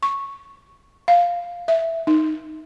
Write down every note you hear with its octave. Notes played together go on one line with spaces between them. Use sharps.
C#6
F5
E5
D#4